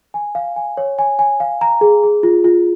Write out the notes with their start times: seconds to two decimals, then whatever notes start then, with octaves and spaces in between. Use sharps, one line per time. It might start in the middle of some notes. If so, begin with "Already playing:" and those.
0.14 G#5
0.35 F5
0.56 G#5
0.77 C#5
0.99 G#5
1.19 G#5
1.40 F5
1.61 A#5
1.81 G#4
2.03 G#4
2.23 F4
2.44 F4